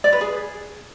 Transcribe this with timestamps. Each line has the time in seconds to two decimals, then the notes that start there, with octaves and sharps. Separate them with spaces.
0.04 D5
0.12 B4
0.21 G#4